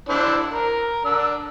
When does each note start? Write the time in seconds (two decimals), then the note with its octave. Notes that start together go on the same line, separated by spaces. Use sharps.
0.09 D4 E4 C5
0.51 A#4
1.05 D4 E6